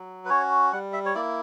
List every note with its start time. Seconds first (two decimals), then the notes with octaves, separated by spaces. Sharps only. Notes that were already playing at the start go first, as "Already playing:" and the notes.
Already playing: F#3
0.25 B4
0.29 C#4 F#4 C#5
0.72 G3 F#5
0.93 E5
1.06 C#5
1.15 A#3 E4 D5